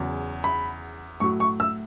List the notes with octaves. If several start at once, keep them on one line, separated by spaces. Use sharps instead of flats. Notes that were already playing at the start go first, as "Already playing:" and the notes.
Already playing: E2 C#3 F#3
B5
A2 F#3 C#6
C#6
E6